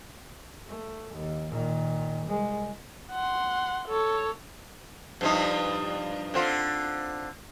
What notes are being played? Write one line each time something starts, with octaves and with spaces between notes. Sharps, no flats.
A3
D#2
A#2 D#3
C2 G#3
F#5 C6
A4 C#5
G2 F3 D#4
D3 C4 F4